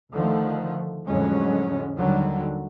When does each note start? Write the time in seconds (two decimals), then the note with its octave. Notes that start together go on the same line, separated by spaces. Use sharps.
0.12 D2 D3 D#3 F3 A3
1.07 F2 A2 D3 F#3 G#3 C#4
1.97 D#2 D3 D#3 F#3 G3